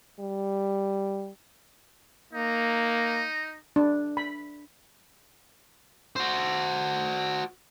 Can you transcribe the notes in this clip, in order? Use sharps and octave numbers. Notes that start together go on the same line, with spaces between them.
G3
A#3 D#4
D4
B5
F#4 C5